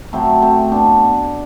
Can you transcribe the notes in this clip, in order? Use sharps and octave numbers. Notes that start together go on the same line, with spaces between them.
A2 F#3 A3 C4
A3 C4
B3 D4